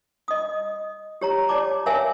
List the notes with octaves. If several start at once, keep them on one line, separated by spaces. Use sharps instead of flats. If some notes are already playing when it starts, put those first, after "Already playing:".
D#5 D#6
G4 C#5 A#5
C#5 D5 A5 D6
A#4 C#5 E5 F5 G#5